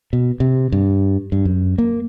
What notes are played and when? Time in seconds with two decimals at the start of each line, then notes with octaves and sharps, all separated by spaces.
0.13 B2
0.40 C3
0.72 G2
1.32 G2
1.45 F#2
1.78 A#3